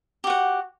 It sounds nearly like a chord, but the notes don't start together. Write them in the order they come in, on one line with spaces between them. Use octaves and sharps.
G4 F#4 F#5